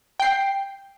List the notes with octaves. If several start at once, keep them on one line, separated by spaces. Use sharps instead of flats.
G5 C7